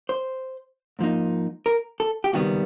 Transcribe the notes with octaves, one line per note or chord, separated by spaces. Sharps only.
C5
G#2 F3 A#3 D#4
A#4
A4
G4
C#2 C3 D#3 G3 B3 F#4